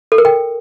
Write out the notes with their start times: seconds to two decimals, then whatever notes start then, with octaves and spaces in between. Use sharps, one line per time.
0.12 A4
0.18 A#4
0.25 G5